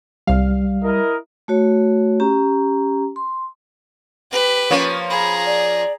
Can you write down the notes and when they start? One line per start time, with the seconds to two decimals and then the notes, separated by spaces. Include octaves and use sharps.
0.27 C2 G3 F5
0.83 E4 A#4 D#5
1.48 A3 F#4 C#5
2.20 C#4 G4 A#5
3.16 C6
4.31 G4 B4
4.70 F3 A#3 C#4 C#6
5.10 G#4 A#5 B5
5.46 D5